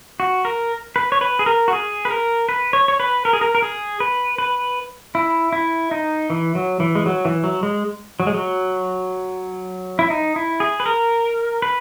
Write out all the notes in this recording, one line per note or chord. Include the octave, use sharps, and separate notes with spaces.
F#4
A#4
B4
C#5
B4
G#4
A#4
F#4
G#4
B4
A#4
B4
C#5
C#5
B4
A#4
G#4
A#4
A#4
G#4
B4
B4
E4
E4
D#4
E3
F#3
E3
G#3
F#3
E3
F#3
G#3
F#3
G#3
F#3
E4
D#4
E4
G#4
B4
A#4
B4